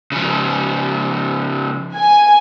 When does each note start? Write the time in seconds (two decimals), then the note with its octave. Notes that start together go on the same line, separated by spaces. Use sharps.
0.12 C#3 F3
1.96 G#5